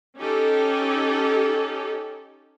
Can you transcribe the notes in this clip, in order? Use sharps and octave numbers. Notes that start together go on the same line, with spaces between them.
C#4 D#4 G4 A4